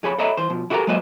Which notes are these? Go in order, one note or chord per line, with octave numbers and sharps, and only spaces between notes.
F2 G#4 C#5 B5
A4 C#5 D#5 E5 A#5 B5
E3 C5
B2 F3
E4 F#4 G4 A4 A#4 A#5
F#3 G#3 A#3 B4 C5 D#5